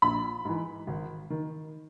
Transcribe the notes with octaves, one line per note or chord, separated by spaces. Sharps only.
A#1 B5
G#2 E3
G#1
D#3